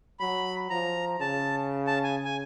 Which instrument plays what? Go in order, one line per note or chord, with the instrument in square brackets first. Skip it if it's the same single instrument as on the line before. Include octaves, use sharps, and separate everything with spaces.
[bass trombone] F#3 [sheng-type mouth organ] B5
[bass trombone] F3 [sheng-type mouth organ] A#5
[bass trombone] C#3 [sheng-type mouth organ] A5
[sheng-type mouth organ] A5
G#5
G#5